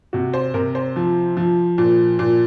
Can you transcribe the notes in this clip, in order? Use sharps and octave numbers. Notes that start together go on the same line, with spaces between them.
C3 F#4
C5
C3 A#4
C5
F3
F3
A#2
A#2